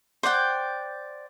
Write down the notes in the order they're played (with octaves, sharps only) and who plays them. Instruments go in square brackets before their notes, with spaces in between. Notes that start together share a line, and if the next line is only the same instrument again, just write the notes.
[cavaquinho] C5 D5 F#5 G5